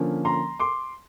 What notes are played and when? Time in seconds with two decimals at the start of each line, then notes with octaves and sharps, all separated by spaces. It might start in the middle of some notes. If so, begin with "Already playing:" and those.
Already playing: D3 F3 A#3 C#4
0.25 A#5 C6
0.60 C6 D6